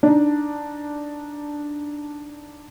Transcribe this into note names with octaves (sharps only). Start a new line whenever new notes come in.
D4 D#4